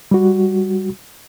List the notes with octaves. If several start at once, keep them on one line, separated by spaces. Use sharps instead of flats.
G3 F#4